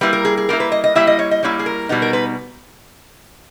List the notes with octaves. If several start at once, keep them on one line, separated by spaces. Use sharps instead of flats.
G3 A#3 E4 B4
A#4
G#4
G#4
G3 A#3 E4 A#4
B4
D#5
D#5
G3 A#3 E4 E5
D#5
C#5
D#5
G3 A#3 E4 C#5
G#4
A#4
B2 G3 B3 D#4
A#4
B4